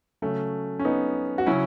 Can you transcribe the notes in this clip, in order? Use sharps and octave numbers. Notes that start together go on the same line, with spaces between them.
C#3 F#3 A3 C#4
C#4
B3 D#4
F#4
C#3 F#3 C#4 E4